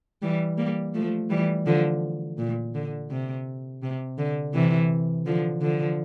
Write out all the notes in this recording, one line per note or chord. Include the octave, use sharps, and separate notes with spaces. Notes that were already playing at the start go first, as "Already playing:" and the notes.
E3 G3
G3 A#3
F3 A3
E3 G3
D3 F3
A#2
D3
C3
C3
D3
C3 E3
D3 F3
D3 F3